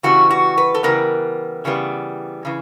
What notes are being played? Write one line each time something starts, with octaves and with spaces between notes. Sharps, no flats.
C#3 E3 G3 B3 F#4
F#4
B4
A4
C#3 E3 G3 B3 A#4
C#3 E3 G3 B3
C#3 E3